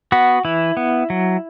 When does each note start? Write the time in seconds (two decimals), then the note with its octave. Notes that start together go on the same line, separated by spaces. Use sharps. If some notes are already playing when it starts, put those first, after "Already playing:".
0.12 B3 F#4
0.45 E3 E4
0.77 B3
1.10 F#3